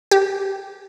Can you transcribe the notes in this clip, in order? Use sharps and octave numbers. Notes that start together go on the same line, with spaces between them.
G4